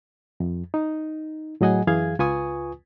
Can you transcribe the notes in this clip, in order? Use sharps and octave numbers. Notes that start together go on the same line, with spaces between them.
F2
D#4
A2 F#3 G#4 D#5 F#5 G#5
F#2 E3 G#4 F5 G#6
C#2 F4 B4 G#5 C#6 D#6